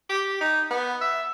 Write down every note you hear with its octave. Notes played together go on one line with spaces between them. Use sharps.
G4
D#4
B3
E5